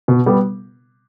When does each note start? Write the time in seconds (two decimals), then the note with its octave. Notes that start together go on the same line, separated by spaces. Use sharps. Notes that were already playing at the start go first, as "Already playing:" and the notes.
0.08 B2
0.26 G3 B3